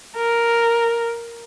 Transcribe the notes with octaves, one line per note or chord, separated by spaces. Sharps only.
A#4